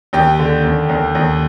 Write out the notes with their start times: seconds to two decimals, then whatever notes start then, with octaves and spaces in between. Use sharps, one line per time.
0.13 D#2 G4
0.39 D3
0.64 D#2
0.89 D#2
1.15 D#2